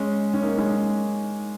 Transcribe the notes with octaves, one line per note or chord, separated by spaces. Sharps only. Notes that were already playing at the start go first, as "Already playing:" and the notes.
Already playing: G#3 C#4
C#4
A#3 D#4
G#3 C#4